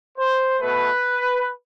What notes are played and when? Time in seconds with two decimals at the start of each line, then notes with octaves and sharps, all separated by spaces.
0.18 C5
0.60 B2 A3 B4